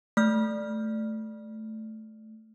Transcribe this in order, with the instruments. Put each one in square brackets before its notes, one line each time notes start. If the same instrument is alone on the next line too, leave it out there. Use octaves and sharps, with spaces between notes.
[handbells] A3 F6